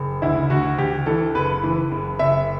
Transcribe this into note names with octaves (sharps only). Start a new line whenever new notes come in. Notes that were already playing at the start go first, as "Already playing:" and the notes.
Already playing: F#1
D2 E4
D2 F#4
D2 G4
E3 A4
F#1 B4
E3
F#1
F#1 E5